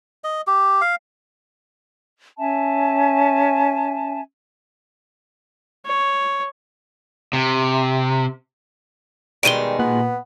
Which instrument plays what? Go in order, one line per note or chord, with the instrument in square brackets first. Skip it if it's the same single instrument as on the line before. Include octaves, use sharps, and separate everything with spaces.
[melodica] D#5
G4
F5
[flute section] C#4 E5 G#5 A5
[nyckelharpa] C#5
[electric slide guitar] C3
[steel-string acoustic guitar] B2 D#3 G#3 [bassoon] G3 [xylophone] D7 D#7 G7
[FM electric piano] A#2 F#6 [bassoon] B3